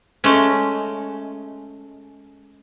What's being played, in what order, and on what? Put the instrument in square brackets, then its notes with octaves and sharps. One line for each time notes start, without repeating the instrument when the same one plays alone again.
[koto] G#3 A3 C#4